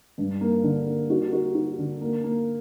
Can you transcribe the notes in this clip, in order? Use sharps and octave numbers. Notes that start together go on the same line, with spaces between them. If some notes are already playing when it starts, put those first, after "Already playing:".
G2
A#3
D3
A#3
F#4
F#4
F#4
D3
A#3
A#3